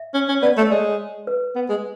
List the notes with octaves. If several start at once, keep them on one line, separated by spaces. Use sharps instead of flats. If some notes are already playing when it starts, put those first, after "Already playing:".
Already playing: E5
C#4
C#4
B3 D5
A3
C#5
G#3 D5
B4
B3
G#3